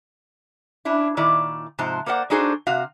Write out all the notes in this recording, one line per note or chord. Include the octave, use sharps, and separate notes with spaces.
C#4 D4 E4
A#2 D#3 E4 D5
G#2 C3 F3 C5 A5
A#3 A#4 C5 D5 F#5
D4 D#4 F#4 G#4 A4 C5
C3 F#4 F5